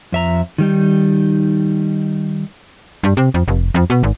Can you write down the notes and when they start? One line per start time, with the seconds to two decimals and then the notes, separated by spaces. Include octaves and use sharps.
0.12 F2 E5 A#5
0.58 D#3 G3 D#4
3.04 G2
3.17 C3
3.34 F2
3.48 F1
3.74 F2
3.90 B2
4.03 G#1